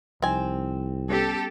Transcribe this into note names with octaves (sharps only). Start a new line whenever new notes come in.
C2 F3 C4 D#4 G#5
G3 B3 C#4 G4 A4